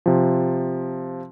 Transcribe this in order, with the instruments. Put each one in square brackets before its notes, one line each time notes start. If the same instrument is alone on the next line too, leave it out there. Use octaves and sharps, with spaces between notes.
[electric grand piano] C3 F3